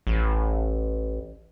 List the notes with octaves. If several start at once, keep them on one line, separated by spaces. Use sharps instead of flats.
A1